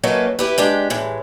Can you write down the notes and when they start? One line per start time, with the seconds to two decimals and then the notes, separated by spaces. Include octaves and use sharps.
0.03 F#3 A3 A#3 C#4 B4 D#5
0.39 E4 G4 B4
0.58 G#3 D4 G4
0.90 A2 E3 G#3